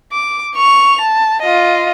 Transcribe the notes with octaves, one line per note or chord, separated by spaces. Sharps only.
D6
C#6 F7
A5
F4 D#5